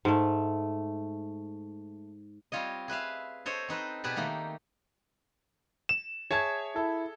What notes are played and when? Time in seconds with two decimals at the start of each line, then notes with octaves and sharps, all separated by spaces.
0.05 G#2 A3
2.52 G3 C4 F4 C#5 D#5
2.88 G#4 B4 E5 F5
3.46 A4 C5 C#5 D#5
3.68 C4 D#4 B4 C5
4.04 B2 G4 G#4 B4 D5 A5
4.16 D#3 A3 A#3 D#4
5.89 E7
6.31 G#4 C#5 E5 A5 G#6
6.76 E4 A4